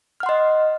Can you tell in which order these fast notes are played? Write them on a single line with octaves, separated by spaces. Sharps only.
F6 F#5 C6 D#5